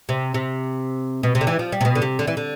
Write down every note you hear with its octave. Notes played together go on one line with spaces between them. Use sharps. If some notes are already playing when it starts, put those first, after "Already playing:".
C3
C3
B2
C3
D3
E3
F3
G3
C3
B2
D3
C3
D3
E3
D3